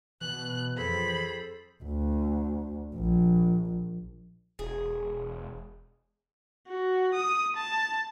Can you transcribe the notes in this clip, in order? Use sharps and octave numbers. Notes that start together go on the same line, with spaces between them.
B2 E3 F#6
F2 G#4 A4 C5 B5
D2
A#1
E1 G#4
F#4
D#6
A5